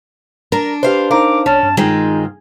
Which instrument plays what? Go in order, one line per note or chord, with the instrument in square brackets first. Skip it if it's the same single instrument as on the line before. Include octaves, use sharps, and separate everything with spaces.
[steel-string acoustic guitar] D4 [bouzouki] A#4
[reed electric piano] G4 B4 [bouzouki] C5 F5
[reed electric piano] D#4 C5 F5 [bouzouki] A#4 [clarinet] D6
[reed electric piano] C2 C#5 [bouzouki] C#4 [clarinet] A5
[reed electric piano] G2
[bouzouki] D#3 C4 F4 [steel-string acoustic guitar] G#3 [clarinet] D#4